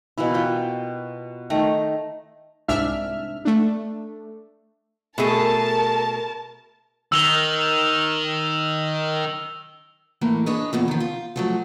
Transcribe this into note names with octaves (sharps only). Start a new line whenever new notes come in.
B2 E3 A#3 E4
F4 G5
D#3 A3 A#5
C2 G#2 D4 E5 F6
A3 D4
B2 A3 G#4 A#4 A5
D#3 E6 F7 G7
A2 E3 A#3
D4 G#4 B4 C#5 D#5
E2 A#2 E3
D#3 F3
F4
F3 F#3 A3